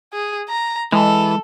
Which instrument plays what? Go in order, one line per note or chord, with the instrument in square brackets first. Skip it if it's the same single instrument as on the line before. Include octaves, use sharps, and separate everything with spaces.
[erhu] G#4
A#5
[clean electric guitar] E3 [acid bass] G#3 [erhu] A4